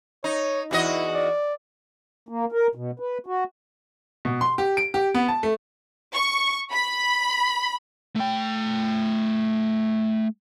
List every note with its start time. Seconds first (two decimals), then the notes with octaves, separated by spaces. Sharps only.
0.24 D#4 C#5
0.71 E2 E4 F#4 D#5
1.14 D5
2.29 A#3
2.52 A#4
2.75 B2
3.00 B4
3.26 F#4
4.25 B2
4.41 C6
4.58 G4
4.77 D7
4.94 G4
5.14 B3
5.28 A5
5.43 A3
6.13 C#6
6.71 B5
8.16 A3 G5